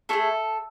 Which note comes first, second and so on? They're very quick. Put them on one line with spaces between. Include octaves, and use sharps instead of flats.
A3 E4 A4 G#4